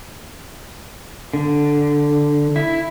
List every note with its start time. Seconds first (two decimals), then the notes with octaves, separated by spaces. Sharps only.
1.33 D3
2.56 E4